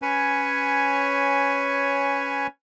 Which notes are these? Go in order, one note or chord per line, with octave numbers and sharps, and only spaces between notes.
C#4 B4 C#5 G#5